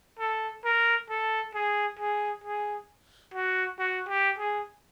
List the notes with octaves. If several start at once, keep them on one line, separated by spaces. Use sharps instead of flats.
A4
A#4
A4
G#4
G#4
G#4
F#4
F#4
G4
G#4